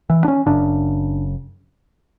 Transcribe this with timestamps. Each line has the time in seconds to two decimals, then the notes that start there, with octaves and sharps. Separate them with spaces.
0.10 E3
0.24 D4
0.28 C#4
0.46 F#1 F#2 C#3 D4